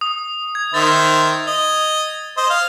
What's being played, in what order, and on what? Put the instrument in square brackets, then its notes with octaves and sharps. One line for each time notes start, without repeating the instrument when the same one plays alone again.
[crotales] D#6
G#6
[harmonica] D#3 C5 E5 [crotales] D#6 A6
[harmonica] D#5
C5 D#5
F5